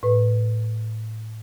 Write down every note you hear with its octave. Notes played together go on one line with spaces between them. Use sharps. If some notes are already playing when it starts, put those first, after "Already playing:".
A2 B4